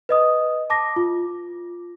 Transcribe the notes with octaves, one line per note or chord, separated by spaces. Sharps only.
B4 D#5 D#6
A5 D6 A#6
F4